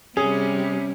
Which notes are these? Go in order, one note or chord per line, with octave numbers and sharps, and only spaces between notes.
C3 G3 C#4 G#4